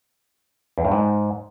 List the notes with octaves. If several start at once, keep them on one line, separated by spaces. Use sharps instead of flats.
E2
G2
G#2